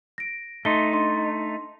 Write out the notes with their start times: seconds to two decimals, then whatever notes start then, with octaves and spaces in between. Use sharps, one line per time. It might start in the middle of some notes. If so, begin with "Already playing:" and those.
0.18 A#6 D7
0.65 A3 D#4 C6 G7
0.93 D4 D#5 C6